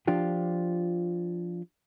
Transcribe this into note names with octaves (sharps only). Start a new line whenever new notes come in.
F3 D4 F4 G4